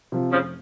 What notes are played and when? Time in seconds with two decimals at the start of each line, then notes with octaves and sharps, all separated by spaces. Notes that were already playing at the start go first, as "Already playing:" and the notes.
0.12 C3 F3
0.32 F1 C#3 F3